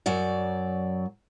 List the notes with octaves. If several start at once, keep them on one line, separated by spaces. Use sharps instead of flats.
F#2 F#3 D5